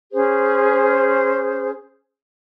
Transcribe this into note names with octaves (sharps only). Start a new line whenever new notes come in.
C#4 G#4 C5